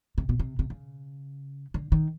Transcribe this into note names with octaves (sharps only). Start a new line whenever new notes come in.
C3
B2
C3
C3
C#3
D3
D#3